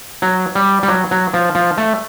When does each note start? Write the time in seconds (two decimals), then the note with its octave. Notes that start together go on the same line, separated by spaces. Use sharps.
0.22 F#3
0.55 G3
0.83 G3
0.88 F#3
1.11 F#3
1.34 F3
1.55 F3
1.78 A3